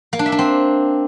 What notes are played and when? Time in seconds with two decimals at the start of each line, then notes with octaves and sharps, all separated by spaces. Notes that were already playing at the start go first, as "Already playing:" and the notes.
0.13 A#3
0.19 D4
0.26 E5
0.32 D4
0.39 C4